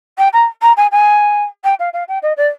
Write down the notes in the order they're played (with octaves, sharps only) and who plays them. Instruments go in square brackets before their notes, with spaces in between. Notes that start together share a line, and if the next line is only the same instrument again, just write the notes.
[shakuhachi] G5
A#5
A#5
G#5
G#5
G5
F5
F5
G5
D#5
D5